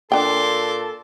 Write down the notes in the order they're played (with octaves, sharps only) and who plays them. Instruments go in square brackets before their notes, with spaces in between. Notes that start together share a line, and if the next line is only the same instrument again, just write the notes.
[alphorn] A#2 [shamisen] D4 G5 [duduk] A4 [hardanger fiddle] C6 D6